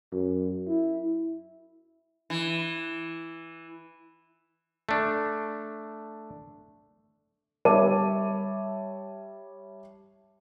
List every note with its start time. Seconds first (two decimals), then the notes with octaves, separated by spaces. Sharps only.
0.12 F#2
0.67 E4
2.30 E3
4.89 A3 D4
7.65 G3 C#5 E5 A5 D6 D#7